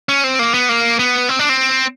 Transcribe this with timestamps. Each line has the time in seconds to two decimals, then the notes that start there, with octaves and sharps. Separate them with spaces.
0.09 C#4
0.24 C4
0.39 A#3
0.54 B3
0.69 A#3
0.99 B3
1.29 C4
1.39 D4
1.49 C4